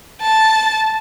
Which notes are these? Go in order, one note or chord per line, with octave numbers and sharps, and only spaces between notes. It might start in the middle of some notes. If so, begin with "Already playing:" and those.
A5